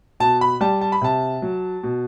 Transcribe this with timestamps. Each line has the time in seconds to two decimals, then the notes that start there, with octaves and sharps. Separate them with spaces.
0.20 B2 A5
0.41 B5
0.61 G3 A5
0.81 A5
0.92 B5
1.01 C3 A5
1.42 F#3
1.83 B2